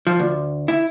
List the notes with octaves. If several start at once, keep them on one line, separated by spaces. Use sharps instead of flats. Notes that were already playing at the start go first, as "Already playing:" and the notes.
F3
D2
E4